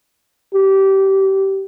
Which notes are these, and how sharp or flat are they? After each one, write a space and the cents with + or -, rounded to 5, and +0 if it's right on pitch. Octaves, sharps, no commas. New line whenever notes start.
G4 -20